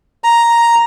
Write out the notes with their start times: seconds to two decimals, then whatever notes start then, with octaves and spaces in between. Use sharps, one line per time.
0.24 A#5